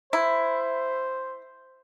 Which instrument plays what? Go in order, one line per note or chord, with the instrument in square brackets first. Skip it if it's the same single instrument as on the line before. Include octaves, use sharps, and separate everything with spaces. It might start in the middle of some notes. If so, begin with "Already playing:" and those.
[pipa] E4 [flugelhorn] C5